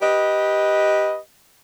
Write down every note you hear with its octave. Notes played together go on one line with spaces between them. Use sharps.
G4 B4 D#5